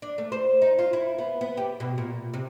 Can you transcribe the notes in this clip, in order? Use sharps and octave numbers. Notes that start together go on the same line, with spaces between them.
D4
A3
C5
D#4
F4
E4
B3
B3
G4
B2
A#2
C3